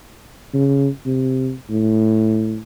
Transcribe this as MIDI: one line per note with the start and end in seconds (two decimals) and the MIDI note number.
0.54 0.89 49
1.06 1.53 48
1.70 2.59 45